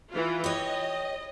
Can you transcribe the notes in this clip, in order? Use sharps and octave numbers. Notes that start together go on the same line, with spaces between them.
E3 F4
G4 C#5 D#5